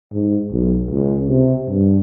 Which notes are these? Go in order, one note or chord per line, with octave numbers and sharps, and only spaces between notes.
G#2
B1
C#2
C3
G2